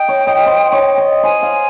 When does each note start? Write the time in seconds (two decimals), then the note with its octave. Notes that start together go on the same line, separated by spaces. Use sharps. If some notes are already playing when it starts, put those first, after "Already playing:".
Already playing: D#5 F5 G5
0.08 C#5
0.27 D#5
0.46 C5
0.72 C#5
0.97 D#5
1.23 C5 G#5
1.42 F5